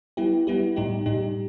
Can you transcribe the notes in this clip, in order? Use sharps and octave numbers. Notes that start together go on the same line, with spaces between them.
G3 B3 E4 G4
G3 B3 E4 G4
A2 G3 D#4 G4
A2 G3 D#4 G4